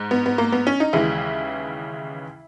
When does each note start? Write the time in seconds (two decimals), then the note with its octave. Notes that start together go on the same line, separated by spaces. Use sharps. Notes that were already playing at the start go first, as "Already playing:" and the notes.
Already playing: G#2
0.11 B3
0.26 B3
0.38 A#3
0.52 B3
0.67 C#4
0.80 D#4
0.93 D#2 C#3 E3 G#3 E4